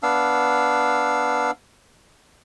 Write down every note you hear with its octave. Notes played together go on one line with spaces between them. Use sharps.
B3 D4 F5 E6